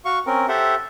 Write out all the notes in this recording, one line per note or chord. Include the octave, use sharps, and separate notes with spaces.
F#4 F5 C#6
C4 C#4 A#4
G4 A4 C5 E5 F#5